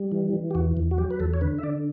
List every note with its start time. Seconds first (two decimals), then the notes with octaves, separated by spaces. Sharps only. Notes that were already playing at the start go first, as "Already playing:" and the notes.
Already playing: G3
0.12 E3
0.33 E3
0.51 G4
0.55 E2 F#4
0.77 E2
0.91 F#4
0.98 F#3 G4
1.11 B4
1.20 E2 A4
1.34 C#5
1.41 D3 B4
1.58 E5
1.63 D3 D5